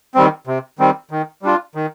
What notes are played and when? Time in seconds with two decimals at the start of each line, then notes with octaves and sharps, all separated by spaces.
0.15 D#3 G3 C4
0.47 C3
0.79 D#3 G3 C4
1.11 D#3
1.42 G3 D4 F4
1.75 D#3